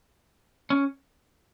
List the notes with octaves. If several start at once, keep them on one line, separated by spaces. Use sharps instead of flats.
C#4